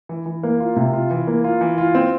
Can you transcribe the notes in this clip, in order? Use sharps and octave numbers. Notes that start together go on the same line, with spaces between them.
E3
E3
A#3
F4
C3
F4
E3
A#3
F4
E3
F4
C4